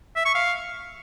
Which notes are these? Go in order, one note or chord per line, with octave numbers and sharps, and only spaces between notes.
E5
C#6
F5